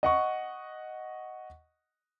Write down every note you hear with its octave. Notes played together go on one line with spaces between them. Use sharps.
D#5 F#5 C#6